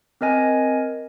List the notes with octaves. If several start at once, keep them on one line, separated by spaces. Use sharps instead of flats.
C4 A#4 D#5 G#5